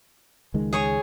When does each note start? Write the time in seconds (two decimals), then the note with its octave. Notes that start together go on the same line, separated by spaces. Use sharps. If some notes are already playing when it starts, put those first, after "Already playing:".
0.54 C#2 D#3 G#3
0.73 G#4 C#5 G#5